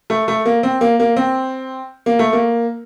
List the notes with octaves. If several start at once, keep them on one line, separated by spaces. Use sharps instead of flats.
A3
A3
A#3
C4
A#3
A#3
C4
A#3
A3
A#3